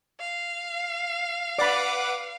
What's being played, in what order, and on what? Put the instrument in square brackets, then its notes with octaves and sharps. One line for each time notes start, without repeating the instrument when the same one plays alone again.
[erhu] F5
[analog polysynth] B4 F#5 D6 [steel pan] D5 B5